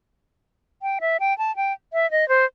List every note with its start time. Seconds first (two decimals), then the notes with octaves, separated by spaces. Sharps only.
0.82 G5
1.01 E5
1.20 G5
1.38 A5
1.56 G5
1.93 E5
2.11 D#5
2.29 C5